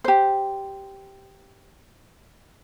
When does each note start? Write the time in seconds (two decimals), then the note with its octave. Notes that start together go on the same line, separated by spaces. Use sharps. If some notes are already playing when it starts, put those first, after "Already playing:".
0.04 G4 C5